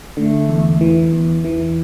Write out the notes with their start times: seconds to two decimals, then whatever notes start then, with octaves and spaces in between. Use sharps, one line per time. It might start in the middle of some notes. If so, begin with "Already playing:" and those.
0.17 D3 A3
0.49 E2
0.81 E3
1.12 E2
1.45 E3